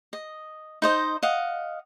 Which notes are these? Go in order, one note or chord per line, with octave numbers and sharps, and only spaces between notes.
D#5
D#4 C5 D#5
D#5 F5 F#5